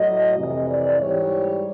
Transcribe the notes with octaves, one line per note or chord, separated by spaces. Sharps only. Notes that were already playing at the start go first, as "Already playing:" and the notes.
Already playing: A2 F#3 D#5
F2 C3 E3 D#5
D5
G#2 E3 G3 C#5